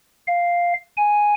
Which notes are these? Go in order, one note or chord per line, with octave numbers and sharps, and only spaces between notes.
F5
G#5